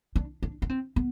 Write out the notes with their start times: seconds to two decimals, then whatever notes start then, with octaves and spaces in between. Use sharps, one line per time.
0.16 D4
0.43 D4
0.62 D4
0.70 C4
0.96 B3